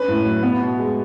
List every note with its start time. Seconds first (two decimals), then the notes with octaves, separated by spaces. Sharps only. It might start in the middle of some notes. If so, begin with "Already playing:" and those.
Already playing: C#4 B4
0.08 A2
0.25 F#3
0.43 B3
0.61 B2
0.79 G#3